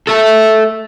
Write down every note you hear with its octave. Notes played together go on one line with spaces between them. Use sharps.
A4 E5